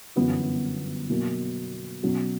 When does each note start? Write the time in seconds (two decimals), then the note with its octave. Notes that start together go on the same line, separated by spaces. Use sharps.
0.16 G1 F#2 E3 B3 F#4
1.09 B2 F#3 A#3
2.03 B2 F#3 C#4 F#4